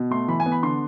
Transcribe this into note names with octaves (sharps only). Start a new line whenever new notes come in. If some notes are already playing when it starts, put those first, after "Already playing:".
Already playing: B2
A3 C6
E3 B5
G#5
B3
B5
D3 C6